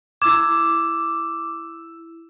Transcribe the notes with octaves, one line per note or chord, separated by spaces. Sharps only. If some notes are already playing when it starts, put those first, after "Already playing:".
E4 D6 E6 E7